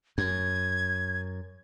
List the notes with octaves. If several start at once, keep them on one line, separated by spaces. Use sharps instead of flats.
F#2 G#6